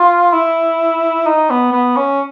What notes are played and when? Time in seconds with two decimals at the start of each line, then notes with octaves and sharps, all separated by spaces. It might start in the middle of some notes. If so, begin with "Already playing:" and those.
Already playing: F4
0.33 E4
1.26 D#4
1.50 B3
1.72 B3
1.96 C#4